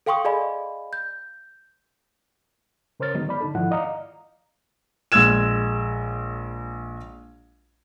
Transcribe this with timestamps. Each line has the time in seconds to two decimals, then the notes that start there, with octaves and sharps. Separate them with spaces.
0.06 A4 F5 G5 C6 C#6 D#6
0.25 G#4 D5 D#5 F5 G#5 B5
0.93 G6
3.00 C#3 A#4 C5 C#5 F6 A6
3.14 D3 D#3 F#3 G#3 B3 D#4
3.29 D5 B5
3.40 D3 D#4 A4
3.55 G#2 D#3 F3 E4 F#5
3.71 D5 D#5 F5 A#5
5.12 A#1 G#3 E6 G#6 E7